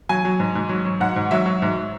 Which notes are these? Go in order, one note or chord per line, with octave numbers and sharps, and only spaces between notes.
F#3 G#5
F#3
G#2
G#2
F#3
F#3
G#2 F#5
G#2
F#3 E5
F#3
G#2